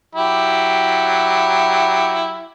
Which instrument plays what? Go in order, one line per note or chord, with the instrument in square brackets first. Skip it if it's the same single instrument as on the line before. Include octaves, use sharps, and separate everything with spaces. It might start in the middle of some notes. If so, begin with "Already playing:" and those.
[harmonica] F#3 E4 G4